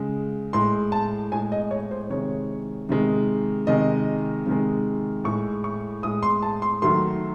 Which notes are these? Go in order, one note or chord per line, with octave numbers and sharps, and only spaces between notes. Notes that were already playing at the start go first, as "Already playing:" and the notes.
Already playing: C#3 G#3
A2 G#3 C6
A5
A2 G#3 G#5
D#5
C#5
C5
C3 D#3 G#3 C#5
C3 D#3 G#3
C3 D#3 G#3 D#5
C3 D#3 G#3
A2 G#3 C#6
C#6
A2 G#3 D#6
C6
A5
C6
D#3 F#3 A3 C6